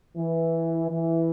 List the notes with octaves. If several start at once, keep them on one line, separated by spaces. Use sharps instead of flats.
E3
E3